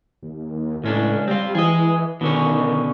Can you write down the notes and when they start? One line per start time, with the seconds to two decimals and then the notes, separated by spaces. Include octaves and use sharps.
0.23 D#2
0.84 C#2 A2 C#4 D4
1.28 G3 C4 F4
1.55 E3 G#4 D#5
2.21 B2 D3 D#3 C#4